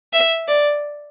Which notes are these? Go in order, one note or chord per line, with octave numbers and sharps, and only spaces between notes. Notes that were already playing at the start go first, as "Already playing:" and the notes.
E5
D5